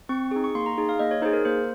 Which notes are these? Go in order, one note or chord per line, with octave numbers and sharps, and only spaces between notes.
C4 C#6
D#4 G#4
C#6
A#3 C6
A#5
D#4 G#4
F5
A#3 D#5
C#5
D#4 G#4 C5
A#4
A#3 C5